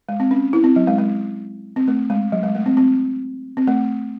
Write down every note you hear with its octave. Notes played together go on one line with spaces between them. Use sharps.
G#3
C4
C#4
E4
C4
F#3
G#3
G#3
C4
A3
G#3
F#3
G#3
A3
C4
C4
C4
A3